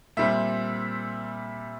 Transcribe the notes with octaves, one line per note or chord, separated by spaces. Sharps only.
A#2 G3 C4 E5